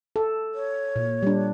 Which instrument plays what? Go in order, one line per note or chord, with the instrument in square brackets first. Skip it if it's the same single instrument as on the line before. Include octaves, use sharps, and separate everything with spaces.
[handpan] A4
[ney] C#5
[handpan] A#2
G3 D4